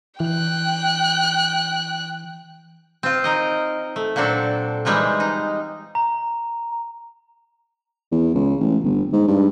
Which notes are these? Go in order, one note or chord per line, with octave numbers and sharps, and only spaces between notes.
E3 G5 F#6
C4 F4
D#4 A#4 D#5
A3
A#2 F#3 C4 D4 A4
E3 G3 G#3 D#4 F4
D#4
A#5
E2
C#2
A1
G1
G#2
G2